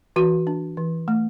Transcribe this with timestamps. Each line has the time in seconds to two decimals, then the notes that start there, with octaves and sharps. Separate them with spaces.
0.16 E3 F#4
0.47 D4
0.77 E3
1.08 A3